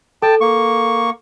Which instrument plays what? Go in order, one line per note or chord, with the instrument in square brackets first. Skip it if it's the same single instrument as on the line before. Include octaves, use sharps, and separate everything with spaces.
[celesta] A4 [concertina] G5 A5
[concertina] A#3 C#6